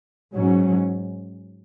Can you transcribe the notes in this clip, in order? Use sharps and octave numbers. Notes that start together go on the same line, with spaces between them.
G#2 F#3 C#4